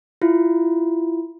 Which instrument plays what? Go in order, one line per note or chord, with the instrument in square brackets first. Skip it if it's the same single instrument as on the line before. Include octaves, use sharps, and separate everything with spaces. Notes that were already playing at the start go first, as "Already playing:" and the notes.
[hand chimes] E4 F4